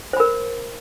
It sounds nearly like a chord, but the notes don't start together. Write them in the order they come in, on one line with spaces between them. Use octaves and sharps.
C5 B5 A#4